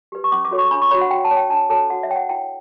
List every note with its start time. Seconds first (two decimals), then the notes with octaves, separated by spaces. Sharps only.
0.12 G4 B4
0.24 C#6
0.32 C#4 D6
0.45 D6
0.51 F#4 A4 C#5
0.58 C#6
0.71 D4 B5
0.82 C#6
0.91 F#4 C#5 B5
1.01 F#5
1.11 F#4 G5
1.24 A5
1.31 C#5
1.37 G5
1.50 D4 A5
1.70 F#4 A4 C#5 A5
1.90 F#4 F#5
2.03 E5
2.09 C#5 G5
2.16 F#5
2.29 E4 G5